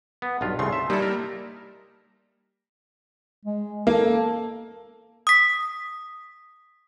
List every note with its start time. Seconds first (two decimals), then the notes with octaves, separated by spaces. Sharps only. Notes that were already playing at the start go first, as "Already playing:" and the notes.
0.22 B3
0.41 B1 G2 F4
0.59 C2 C#3 A3 C6
0.73 E5
0.90 G3 A#3 D#4 E4 A4
1.02 A#4
3.45 G#3
3.87 A#3 A4
5.27 D#6 B6